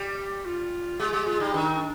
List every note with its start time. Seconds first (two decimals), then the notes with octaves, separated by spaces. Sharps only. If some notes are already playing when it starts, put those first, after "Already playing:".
Already playing: G3 G4
0.45 F4
0.99 G#3 G4
1.13 G#3 G4
1.27 G#3 F4
1.40 G3 D#4
1.53 D#3 D4
1.65 D#4
1.76 D4